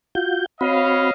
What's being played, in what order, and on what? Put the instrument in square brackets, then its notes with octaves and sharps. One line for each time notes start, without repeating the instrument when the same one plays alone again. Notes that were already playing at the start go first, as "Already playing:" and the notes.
[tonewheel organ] F4 F#4 G6
[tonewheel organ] C4 F#4 B5 [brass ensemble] C#5 D#5 F5